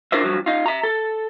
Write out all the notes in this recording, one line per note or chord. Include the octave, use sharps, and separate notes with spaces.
D4 F4 A#4 C5 E5
G2 F3 F#3
D#4 F4
E5 A#5
A4